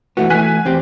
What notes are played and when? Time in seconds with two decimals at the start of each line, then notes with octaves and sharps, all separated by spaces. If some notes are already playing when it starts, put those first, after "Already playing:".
0.17 E3 A3 B3 F#4
0.30 E3 A3 G#5 F#6 B6
0.65 E2 C4 G4